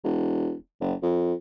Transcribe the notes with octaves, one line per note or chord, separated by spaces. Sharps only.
E1
F#1
F2